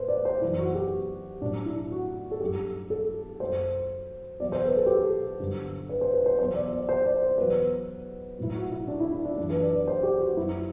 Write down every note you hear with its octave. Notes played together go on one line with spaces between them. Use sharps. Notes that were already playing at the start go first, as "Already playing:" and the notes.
Already playing: A2 B4 C5
D5
C5
F#2 E3 E4
F#4
G4
A2 F#3 D4
E4
F#4
A4
G2 F#3 G4
A4
F#2 F#3 C5
E2 B2 F#3 D5
C5
B4
A4
G4
A4
G2 D3 F#3
B4
C5
B4
C5
E2 B2 F#3 C5
D5
D5
C5
D5
C5
E2 B2 F#3 B4
A2 F#3 E4
F#4
E4
D4
E4
E4
D4
F#2 E3 D4
B4
D5
D5
C5
G4
F#4
F#2 F#3 E4